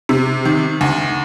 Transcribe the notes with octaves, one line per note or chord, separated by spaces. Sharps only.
C3
D#3
D2